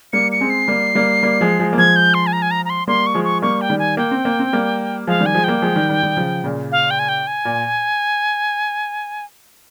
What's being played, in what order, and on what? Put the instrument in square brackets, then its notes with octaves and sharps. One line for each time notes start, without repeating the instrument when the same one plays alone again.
[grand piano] G3 A#3 [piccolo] C#7
[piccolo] C#7
[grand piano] G#3 C4
[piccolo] C7
[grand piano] G3 A#3
G3 A#3
G3 A#3
F3 G#3
F3 G#3
A#3
[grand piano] F3 G#3 [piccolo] G#6
[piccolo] G6
C6
G#5
A#5
G#5
A#5
A#5
C6
[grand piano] G3 A#3 [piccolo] C6
[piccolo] C#6
[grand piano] F3 G#3
[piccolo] C#6
[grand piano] G3 A#3 [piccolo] C#6
[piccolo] G5
[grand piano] D#3 G3
[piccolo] G#5
[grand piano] A#3 [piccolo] G5
[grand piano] C4
A#3
C4
G3 A#3
[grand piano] F3 G#3 [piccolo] F5
[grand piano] D#3 G3
[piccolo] G#5
[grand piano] F3 G#3
[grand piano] G3 A#3 [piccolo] G5
[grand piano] F3 G#3
D#3 G3
D#3 G3
D#3 G3
C#3 F3
A#2 C#3
[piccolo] F5
G5
G#5
G5
G#5
[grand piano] A#2